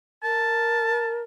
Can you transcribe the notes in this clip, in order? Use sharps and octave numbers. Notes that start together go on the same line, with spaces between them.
A#4 A5